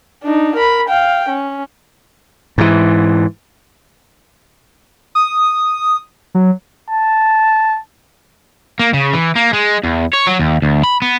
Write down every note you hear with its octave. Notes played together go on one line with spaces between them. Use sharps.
D4 D#4
A#4 B5
F5 G5
C#4
G#2 E3
D#6
F#3
A5
A#3
C#3
E3
A#3
G#3
E2
C#5
F#3
D#2
D2
B5
B3